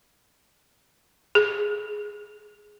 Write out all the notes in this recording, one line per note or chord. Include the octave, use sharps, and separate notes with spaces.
G#4